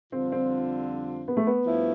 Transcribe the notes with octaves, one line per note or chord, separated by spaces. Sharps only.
F2 D3 G3 C4 D4 F4
C4
B3
A3
B3
G2 F3 A3 E4